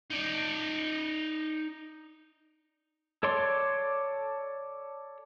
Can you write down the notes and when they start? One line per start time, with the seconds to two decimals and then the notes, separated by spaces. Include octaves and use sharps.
0.10 D#4 D5
3.23 A4 C#5 D5 C6